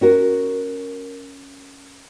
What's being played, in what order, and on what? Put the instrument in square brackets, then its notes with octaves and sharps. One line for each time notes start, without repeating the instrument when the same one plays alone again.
[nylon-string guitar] C#4 F#4 A#4